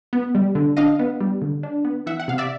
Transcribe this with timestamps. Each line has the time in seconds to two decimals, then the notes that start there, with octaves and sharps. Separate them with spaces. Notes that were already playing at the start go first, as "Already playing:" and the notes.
0.13 B3
0.35 G3
0.55 D3
0.77 D4 D#5 F5
0.99 B3
1.20 G3
1.42 D3
1.63 D4
1.85 B3
2.06 E3 E5 F#5
2.20 F#5
2.28 C3 F5
2.38 D5 E5